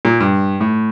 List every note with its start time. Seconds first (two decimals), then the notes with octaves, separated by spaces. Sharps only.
0.05 A#2
0.20 G2
0.61 A2